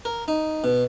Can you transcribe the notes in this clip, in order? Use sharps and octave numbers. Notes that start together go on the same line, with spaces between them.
A#4
D#4
B2